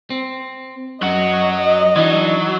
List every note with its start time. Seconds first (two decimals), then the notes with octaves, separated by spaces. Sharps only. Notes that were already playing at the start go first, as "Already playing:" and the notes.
0.10 C4
1.02 F#2 F#3 F#4 D#5
1.96 E3 F#3 D4 D#4